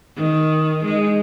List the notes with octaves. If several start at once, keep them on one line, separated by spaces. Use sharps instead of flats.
D#3
G#3 D#4